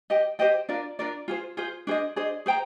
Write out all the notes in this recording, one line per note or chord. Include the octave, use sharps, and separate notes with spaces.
G4 C5 D#5 G5
G4 C5 D#5 G5
D4 F4 A#4 D5
D4 F4 A#4 D5
F4 G#4 C5
F4 G#4 C5
D4 G#4 C5 D#5
D4 G#4 C5 D#5
G#4 C5 G5 A#5